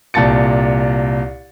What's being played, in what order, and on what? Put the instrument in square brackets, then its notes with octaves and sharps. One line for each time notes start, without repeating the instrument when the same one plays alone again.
[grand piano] C2 A#2 A5 A6 C#7